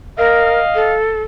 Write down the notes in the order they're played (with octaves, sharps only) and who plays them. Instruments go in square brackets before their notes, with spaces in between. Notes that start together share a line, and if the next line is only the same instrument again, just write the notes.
[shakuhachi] A#4 [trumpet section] D#5 F5
[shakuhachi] A4